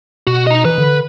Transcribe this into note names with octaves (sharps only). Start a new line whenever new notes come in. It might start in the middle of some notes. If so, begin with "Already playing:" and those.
B2 F#4
D#4 D#5
E3 B4
D3